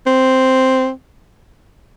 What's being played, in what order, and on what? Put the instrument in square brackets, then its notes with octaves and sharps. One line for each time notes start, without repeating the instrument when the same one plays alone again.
[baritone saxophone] C4